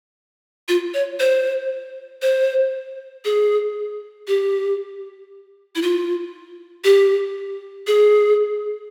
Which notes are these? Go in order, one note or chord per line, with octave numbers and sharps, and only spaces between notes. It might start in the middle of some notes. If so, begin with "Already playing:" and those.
F4
C#5
C5
C5
G#4
G4
E4
F4
G4
G#4